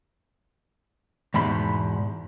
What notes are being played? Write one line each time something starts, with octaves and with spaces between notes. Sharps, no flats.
E2 G#2 B2 B5 C6